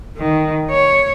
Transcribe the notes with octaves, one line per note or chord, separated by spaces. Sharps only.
D#3
C#5